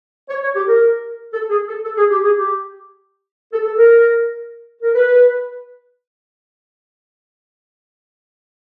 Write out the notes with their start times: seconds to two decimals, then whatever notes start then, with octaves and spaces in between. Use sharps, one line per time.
0.29 C#5
0.43 C#5
0.55 G4
0.68 A#4
1.33 A4
1.50 G#4
1.67 A4
1.84 A4
1.97 G#4
2.10 G4
2.23 G#4
2.36 G4
3.52 A4
3.64 A4
3.77 A#4
4.82 A#4
4.94 B4